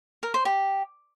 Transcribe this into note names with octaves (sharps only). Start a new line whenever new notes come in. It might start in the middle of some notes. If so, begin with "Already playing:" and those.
A#4
C5
G4